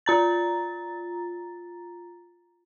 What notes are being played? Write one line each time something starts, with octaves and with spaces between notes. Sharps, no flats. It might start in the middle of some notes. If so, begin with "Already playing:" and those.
F4 A#5 A6